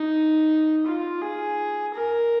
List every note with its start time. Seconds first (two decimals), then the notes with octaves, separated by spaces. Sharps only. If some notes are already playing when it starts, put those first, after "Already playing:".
Already playing: D#4
0.86 F4
1.21 G#4
1.94 A#4